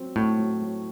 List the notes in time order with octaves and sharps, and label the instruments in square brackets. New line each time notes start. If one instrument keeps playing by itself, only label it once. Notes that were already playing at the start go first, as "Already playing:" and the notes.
Already playing: [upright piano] F#3 C4
[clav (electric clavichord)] A2 [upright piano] F#4
[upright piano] F#3
F#3